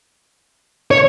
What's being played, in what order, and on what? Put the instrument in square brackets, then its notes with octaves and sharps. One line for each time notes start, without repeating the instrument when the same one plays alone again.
[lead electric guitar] C#5